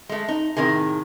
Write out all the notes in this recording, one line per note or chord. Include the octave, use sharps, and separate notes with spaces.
G#3 A3
D#4
A2 C3 D#3 G#4